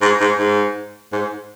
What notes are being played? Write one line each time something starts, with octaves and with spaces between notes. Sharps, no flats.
G#2
G#2
G#2
G#2